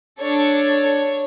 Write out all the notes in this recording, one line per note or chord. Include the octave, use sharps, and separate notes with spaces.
D4 A4 C#5